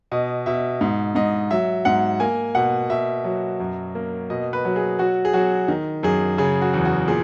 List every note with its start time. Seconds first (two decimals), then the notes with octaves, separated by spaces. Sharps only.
0.12 B2 D#5
0.46 B2 E5
0.81 G#2
1.15 G#2 D#5
1.51 F#3 E5
1.85 G#2 F#5
2.20 A#3 G#5
2.55 B2 F#5
2.90 B2 E5
3.24 F#3
3.60 F#2
3.95 A#3
4.30 B2 D#5
4.53 B4
4.65 F#3
4.76 G#4
4.99 F#3 F#4
5.25 G#4
5.33 F#3 F#4
5.68 D#3
6.03 F#2 G#4
6.38 C#3 G#4
6.62 F#4
6.74 E2
6.85 F#4
7.08 A#2 G#4